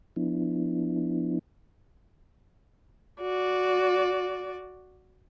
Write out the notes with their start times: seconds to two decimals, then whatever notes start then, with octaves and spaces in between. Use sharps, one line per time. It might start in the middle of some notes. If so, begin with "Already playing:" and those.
0.16 F3 B3 D4 E4
3.21 F#4 D5